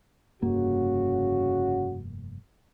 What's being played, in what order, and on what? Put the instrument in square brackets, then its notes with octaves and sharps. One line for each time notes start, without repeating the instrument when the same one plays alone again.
[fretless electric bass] F1 G2 A#3 [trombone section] C#3 F#4